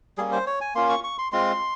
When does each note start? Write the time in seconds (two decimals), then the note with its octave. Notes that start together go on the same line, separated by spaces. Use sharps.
0.18 G3 A#3 C#4 G#4
0.32 C5
0.46 C#5
0.61 G#5
0.75 A#3 C#4 F4 C6
0.89 C#6
1.04 C#6
1.18 C6
1.32 G#3 C4 F4 C6